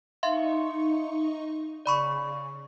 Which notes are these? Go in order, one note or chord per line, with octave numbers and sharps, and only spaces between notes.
D#4 E5 F5 C6 C#6
C#3 D5 B5 C#6